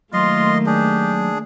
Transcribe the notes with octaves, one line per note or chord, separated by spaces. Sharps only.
D#3 F#3 A3 A#3 F4 D#5 C6
D4 G4 G#4